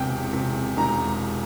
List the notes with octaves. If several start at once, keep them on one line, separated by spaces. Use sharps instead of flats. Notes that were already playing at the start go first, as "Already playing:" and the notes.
Already playing: E1 E2 C3 G5
C3
E1 A#5